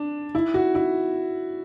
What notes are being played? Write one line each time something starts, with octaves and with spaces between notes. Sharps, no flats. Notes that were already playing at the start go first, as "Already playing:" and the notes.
Already playing: D4
E4
F#4
E4